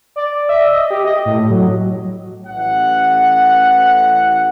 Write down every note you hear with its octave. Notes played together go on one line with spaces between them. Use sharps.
D5
E5
D#5
G4
D#5
A2
F#3
A1 F#5